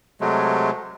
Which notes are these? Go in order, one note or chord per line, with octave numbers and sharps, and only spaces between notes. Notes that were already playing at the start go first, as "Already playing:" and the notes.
C3 F#3 G#3 A3